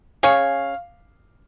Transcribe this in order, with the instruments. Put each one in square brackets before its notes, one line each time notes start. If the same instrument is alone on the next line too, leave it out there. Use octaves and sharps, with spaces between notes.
[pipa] C#4 G#4 C#5 [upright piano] F5